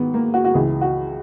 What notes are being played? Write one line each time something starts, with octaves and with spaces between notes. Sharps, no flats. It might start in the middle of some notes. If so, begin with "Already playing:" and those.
Already playing: G#2 D#3 B3
A#3
F#4
F#4
C#2 C#3 E3 G#4
F#4